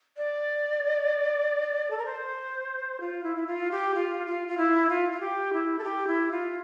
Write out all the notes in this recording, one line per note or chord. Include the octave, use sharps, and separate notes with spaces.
D5
A4
A#4
C5
F4
E4
E4
F4
G4
F4
F4
F4
E4
F4
F4
G4
E4
A4
G4
E4
F4